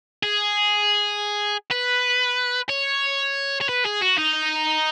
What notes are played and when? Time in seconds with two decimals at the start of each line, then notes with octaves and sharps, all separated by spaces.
0.23 G#4
1.71 B4
2.69 C#5
3.61 C#5
3.69 B4
3.85 G#4
4.01 F#4
4.17 D#4